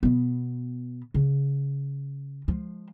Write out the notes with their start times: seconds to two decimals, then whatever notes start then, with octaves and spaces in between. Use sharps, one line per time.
0.03 B2 B3
1.14 C#3
2.48 F3 G#3